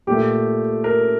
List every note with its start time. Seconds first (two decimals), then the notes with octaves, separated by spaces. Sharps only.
0.07 A#2 A3 G4
0.84 A#4